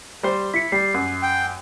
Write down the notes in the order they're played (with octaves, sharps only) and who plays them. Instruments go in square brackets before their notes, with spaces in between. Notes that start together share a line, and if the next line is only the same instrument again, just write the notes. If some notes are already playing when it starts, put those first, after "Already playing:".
[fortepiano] G3 C5
[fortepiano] E4 [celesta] B6 C#7
[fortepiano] G3 [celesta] C7
[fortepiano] F#2
[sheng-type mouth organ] G5